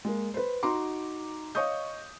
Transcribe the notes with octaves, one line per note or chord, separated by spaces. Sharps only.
G#3 A#3
B4 C5
D#4 F#4 A#5 C6 D6
C#5 D#5 F5 C#6 D#6 G6